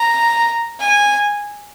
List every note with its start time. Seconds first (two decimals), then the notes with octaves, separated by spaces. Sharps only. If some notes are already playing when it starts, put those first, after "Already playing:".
Already playing: A#5
0.80 G#5